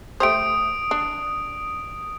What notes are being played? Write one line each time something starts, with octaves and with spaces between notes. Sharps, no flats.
A3 G4 C5 D#6 D7
D4